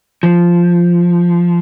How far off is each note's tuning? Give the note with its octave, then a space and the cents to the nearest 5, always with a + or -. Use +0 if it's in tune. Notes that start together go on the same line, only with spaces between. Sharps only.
F3 -5